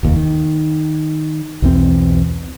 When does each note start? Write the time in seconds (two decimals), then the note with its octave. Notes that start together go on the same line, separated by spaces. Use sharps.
0.03 F1 D#2
0.16 D#3
1.62 B1 E2 C4